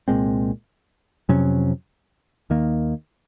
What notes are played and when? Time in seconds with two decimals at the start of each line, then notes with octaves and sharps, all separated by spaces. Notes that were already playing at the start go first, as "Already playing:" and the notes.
0.08 C2 A#2 G#3 C4
1.29 F2 C3 F#3 C#4
2.50 D#2 D#3 A#3